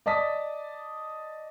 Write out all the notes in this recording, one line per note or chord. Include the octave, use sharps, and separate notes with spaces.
D5 D#5 A5 D#6 B6